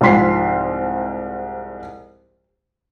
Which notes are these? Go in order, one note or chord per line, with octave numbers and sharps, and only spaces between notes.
C2 G#2 F3 C6 B6 C7